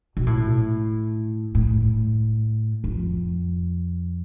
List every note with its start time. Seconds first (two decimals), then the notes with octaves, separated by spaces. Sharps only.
0.17 B2
0.27 A2
1.55 A2
2.84 F2